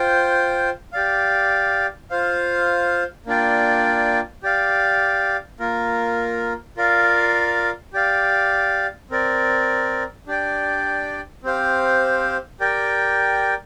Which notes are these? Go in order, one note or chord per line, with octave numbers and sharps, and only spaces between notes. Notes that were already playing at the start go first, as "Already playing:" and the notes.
Already playing: F4 C5 G5
G4 D5 F5
F4 C5 F5
A#3 D4 F4 D5 G5
G4 D5 F5
A#3 F4 A#4
F4 A#4 D5 F5
G4 D5 F5
C4 A#4 D5
D4 G4 D5 G5
C4 G4 C5 F5
G4 A#4 D5 G5